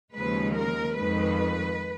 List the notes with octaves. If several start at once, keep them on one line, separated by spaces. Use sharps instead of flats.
D#2 C#3 F3 G#3 B4
A#4
F2 D#3 G#3 B4